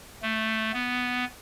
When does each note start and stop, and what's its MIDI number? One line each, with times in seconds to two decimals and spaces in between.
0.22 0.71 57
0.73 1.25 59